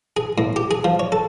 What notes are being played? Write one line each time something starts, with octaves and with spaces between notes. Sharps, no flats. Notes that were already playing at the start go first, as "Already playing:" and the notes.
G#4
A2
G4
G#4
F3
C#5
A4